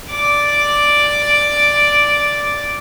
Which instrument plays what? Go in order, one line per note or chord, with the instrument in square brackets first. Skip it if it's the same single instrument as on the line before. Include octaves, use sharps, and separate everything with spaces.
[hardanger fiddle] D5 D6